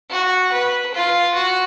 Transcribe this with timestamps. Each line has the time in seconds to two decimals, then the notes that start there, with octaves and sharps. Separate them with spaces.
0.10 F#4
0.52 B4
0.94 F4
1.34 F#4